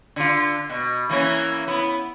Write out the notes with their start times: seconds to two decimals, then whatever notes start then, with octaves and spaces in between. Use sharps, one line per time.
0.16 D3 F4
0.70 B2
1.09 E3 A#3 C#4
1.68 B3 E4